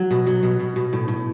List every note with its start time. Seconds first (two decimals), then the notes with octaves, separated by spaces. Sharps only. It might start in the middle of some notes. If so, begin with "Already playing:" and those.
Already playing: F#3 F#4
0.11 B2
0.27 F#3
0.43 B2
0.59 B2
0.76 B2
0.93 A2
1.08 A2